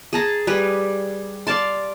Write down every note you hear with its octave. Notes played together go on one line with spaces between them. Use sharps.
G#4 A5 A#5
G3 G#4 B4
D5 F5 A5 C6